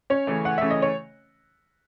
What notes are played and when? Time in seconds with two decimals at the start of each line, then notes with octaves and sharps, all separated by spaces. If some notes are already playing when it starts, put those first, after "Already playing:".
0.10 C#4 C#5
0.27 C#3 E3 A3
0.45 F#5
0.58 C#3 E3 A3 E5
0.71 D#5
0.82 C#5